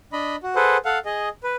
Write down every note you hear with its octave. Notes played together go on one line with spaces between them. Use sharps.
D4 D#5 B5
F#4
G#4 A4 B4 C5 F#5
A4 F5 F#5
G#4 D#5
B4